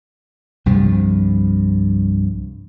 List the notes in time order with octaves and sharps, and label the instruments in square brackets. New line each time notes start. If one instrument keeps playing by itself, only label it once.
[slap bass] C2 G2 C3 F3